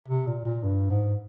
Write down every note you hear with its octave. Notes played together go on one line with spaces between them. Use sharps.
C3
A#2
A#2
G2
G#2